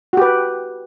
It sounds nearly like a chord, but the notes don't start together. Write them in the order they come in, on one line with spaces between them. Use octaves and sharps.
F#4 G4 B4